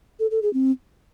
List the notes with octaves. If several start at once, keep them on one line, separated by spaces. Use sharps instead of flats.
A4
A4
G#4
C4